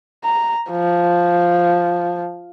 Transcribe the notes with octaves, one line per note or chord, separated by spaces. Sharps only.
A#5
F3